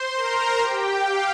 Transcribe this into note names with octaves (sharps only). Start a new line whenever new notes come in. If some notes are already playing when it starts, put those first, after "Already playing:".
Already playing: C5 C6
A#4 A#5
G4 G5
F5